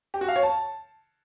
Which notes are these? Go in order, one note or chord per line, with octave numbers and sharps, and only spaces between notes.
G4
F#4
F5
C#5
A5